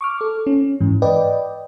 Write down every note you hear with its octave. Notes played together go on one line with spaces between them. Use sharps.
C#6 D6 F6
A4
C#4
G#2 E3
B4 D5 D#5 G5